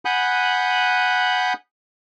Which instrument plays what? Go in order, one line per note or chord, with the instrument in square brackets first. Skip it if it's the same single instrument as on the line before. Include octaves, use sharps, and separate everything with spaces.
[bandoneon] F#5 G#5 B5 D#6 F#6 G6